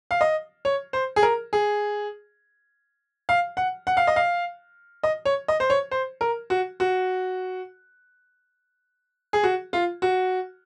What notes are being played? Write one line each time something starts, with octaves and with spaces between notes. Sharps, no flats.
F5
D#5
C#5
C5
G#4
A#4
G#4
F5
F#5
F#5
F5
D#5
F5
D#5
C#5
D#5
C5
C#5
C5
A#4
F#4
F#4
G#4
F#4
F4
F#4